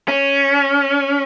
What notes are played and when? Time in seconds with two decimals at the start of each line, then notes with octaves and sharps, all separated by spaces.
0.08 C#4